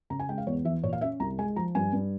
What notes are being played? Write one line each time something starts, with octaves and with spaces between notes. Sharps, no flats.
C#3 A#5
G#5
G#3 G5
F5
E2 C#5
E3 E5
A#2 C#5
F5
C#4 E5
C2 A#5
G#3 G#5
F3 A#5
G2 G#5
G2